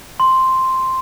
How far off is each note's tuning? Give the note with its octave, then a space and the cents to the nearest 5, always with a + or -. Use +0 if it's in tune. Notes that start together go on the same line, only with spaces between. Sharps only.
C6 +0